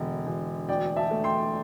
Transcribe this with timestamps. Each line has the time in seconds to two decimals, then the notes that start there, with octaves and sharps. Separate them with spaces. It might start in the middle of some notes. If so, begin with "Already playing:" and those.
Already playing: E1 D3
0.26 E1
0.69 D2 D5 G5
0.97 E5 A5
1.11 A3
1.24 G5 C6